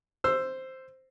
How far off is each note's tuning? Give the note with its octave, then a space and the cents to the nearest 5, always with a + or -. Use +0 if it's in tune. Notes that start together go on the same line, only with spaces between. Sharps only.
C5 +0 E6 +15